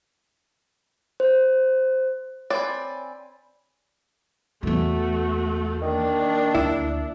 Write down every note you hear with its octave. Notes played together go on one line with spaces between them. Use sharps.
C5
C4 C#5 D5 G#5 B5
E2 E3 A3 F#4
D#3 A#3 D4
D2 E4